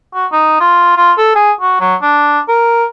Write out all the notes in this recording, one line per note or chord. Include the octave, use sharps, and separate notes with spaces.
F#4
D#4
F4
F4
A4
G#4
F#4
F#3
D4
A#4